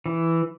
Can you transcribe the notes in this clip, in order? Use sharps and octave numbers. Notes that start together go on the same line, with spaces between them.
E3